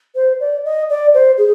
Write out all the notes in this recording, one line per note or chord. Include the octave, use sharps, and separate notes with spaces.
C5
D5
D#5
D5
C5
G#4